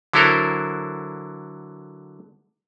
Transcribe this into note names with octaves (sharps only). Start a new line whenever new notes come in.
D3 F#3 E4 A4 A#4 C5